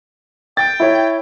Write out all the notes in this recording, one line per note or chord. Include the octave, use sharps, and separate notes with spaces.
G5 A6
E4 C#5